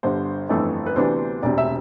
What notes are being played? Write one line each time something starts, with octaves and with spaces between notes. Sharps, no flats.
G1 G2 D3 C5
G1 F2 E3 A3
B4
D2 C3 E3 B3 D4 C5
E1 D2 C3 D5
E5